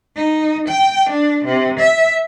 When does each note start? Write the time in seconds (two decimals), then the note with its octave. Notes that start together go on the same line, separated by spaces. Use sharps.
0.16 D#4
0.68 G5
1.09 D4
1.45 C3
1.79 E5